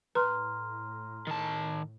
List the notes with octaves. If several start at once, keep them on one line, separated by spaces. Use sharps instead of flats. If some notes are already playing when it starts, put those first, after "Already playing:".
A2 B4 A#5 C6 F6
D#3 A5